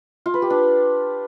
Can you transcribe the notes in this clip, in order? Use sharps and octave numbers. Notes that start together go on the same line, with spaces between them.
F4
B4
G4
D4